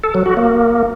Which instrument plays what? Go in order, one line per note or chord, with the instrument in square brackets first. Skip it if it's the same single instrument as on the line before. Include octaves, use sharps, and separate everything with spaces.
[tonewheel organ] A4
F#3
F#4
A#3